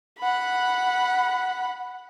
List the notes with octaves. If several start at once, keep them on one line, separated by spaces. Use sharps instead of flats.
F#5 B5